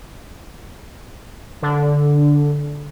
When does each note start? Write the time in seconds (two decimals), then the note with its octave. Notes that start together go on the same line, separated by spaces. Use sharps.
1.62 D3